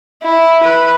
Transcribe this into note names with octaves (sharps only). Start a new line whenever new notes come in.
E4
B4